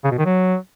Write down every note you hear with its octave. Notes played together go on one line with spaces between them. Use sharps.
C#3
B2
D#3
F#3